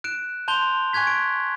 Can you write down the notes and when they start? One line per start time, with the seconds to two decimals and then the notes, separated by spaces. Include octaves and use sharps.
0.04 F#6 D7 E7
0.48 A5 C6 G6 F7 G7
0.93 G#5 C#6 F#6 G#6 B6
1.07 D7